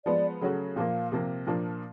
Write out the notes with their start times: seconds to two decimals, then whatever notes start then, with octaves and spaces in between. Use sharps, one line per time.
0.05 F3 G#3 B3 D5
0.41 C#3 F#3 A3 C#4 F#4
0.76 A#2 F3 A#3 F5
1.12 C3 F3 A#3
1.47 A#2 F3 A#3 D4